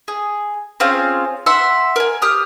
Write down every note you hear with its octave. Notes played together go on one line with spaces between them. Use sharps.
G#4
C4 C#4 F4 G#4
E5 F#5 C6 E6
A#4 G#5
G4 D#6 F6